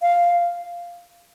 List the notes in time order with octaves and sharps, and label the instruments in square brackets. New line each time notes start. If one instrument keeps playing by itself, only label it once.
[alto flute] F5